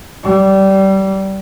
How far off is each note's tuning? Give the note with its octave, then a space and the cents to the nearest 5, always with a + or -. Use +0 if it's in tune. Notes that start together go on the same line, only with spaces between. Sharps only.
G3 -20